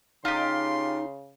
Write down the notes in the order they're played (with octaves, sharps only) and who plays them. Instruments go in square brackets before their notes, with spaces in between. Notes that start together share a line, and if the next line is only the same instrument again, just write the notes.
[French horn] C#3 [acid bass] D#4 [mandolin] F4 G4 [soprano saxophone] C6